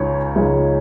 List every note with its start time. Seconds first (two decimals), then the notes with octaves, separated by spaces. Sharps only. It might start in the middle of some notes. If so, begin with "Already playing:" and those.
Already playing: C#2 C#3 G#3 D#4 C#5
0.36 C#2 C#3 G#3 D#4